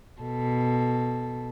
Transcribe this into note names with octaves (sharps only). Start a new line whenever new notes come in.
B2 A4